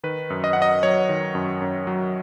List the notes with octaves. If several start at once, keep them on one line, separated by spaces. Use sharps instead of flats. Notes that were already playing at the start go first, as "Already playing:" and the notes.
D#3 B4
F#2
D#5
F#2 F#5
D#5
F#3 C#5
D#3
F#2
F#2
F#3